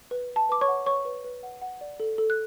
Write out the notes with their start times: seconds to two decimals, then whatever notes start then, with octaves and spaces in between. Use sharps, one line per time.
0.11 B4
0.30 B4
0.36 A5
0.49 B4 D6
0.61 C#5 C#6
0.68 F#5
0.86 B4 C#5 C#6
1.05 B4
1.24 B4
1.43 F#5
1.62 F#5
1.81 D5
2.00 A4
2.18 A4
2.30 F#6